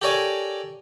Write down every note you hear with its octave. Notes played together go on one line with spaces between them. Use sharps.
G4 A4 A#4 C#5 D5 G#5